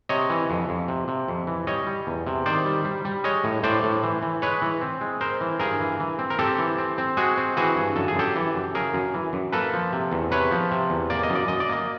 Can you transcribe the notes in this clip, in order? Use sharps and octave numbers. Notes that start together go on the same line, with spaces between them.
C3 C#5 D#5
E3
F2
F2
C3
C3
F2
E3
G3 C#5 D#5
G3
E2
C3
D#3 C5 D5
G3
G3
G3
G#3 C#5 D#5
A2
A2 C5 D5
A2
E3
E3
G#3 B4 C#5
E3
C4
G#3
C4 A#4 C5
E3
G2 G#4 A#4
E3
E3
C4
A#4
C4 G4 A4
E3
C4
C4
G#3 F#4 G#4
C4
E3 F#4 G#4
G2
F#2 A4
G#4
F#2 G4 A4
E3
F#2
C#3 G#4 A#4
F#2
E3
F#2
A#3 A4 B4
F3
C3
E2
C3 B4 C#5
F3
C3
E2
A#3 D5
D#5
F#2
D5
F#2 D#5
D5
A#3 D#5